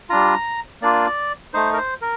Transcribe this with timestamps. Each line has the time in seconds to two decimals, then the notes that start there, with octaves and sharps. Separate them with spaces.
0.09 G3 D4 F4 A#5
0.82 A#3 D4 F4 D5
1.54 A3 D#4 C5
1.73 A#4
1.78 C5
2.01 A#4